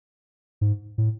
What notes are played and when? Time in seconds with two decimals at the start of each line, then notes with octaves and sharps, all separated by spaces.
0.61 G#2
0.98 A2